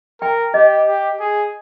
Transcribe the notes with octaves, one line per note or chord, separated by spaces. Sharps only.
A#4 G5
G4 D#5
G4
G#4